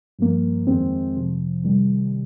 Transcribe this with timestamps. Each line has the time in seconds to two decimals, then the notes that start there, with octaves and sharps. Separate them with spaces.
0.19 G2 F3 A#3
0.67 F2 D#3 G#3 C4
1.15 F2 C3 F3
1.63 C3 D#3 G3